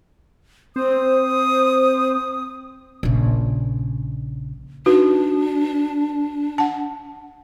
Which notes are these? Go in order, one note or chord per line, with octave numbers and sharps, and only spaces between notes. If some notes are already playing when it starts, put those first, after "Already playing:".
C4 C5 D#6
A#1 C#3
D4 D#4 F#4 B4
F#5 A5